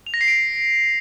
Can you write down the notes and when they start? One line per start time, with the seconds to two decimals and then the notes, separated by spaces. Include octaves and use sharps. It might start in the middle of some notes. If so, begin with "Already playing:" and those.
0.07 F7
0.14 A#6
0.21 C7
0.28 D7